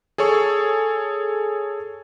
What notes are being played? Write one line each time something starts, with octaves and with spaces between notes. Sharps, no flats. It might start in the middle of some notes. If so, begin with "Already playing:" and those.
G#4 A4 C#5 C#6 E6